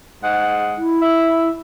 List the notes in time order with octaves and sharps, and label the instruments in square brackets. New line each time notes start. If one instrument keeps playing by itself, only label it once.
[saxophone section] G#2 G#3 F#5
[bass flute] E4
[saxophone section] E5